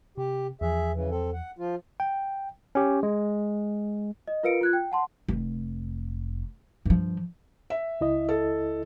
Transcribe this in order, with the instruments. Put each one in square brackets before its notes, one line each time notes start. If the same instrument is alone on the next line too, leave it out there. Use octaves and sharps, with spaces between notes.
[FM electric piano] C3 [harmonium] G4
[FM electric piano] E2 F3 [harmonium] G#4 E5
[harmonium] C#3 E3
C4 A4
F#5
F3 F4
[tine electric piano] G5
C#4 G4
G#3
[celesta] D#5
F4 A#4 B4 F5 C#7 D7
F4 F#6 G#6
G5
F#5 A5 C6
[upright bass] F1
G2 F3
[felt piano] E5
[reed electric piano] C#2 E4 D#5
[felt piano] A4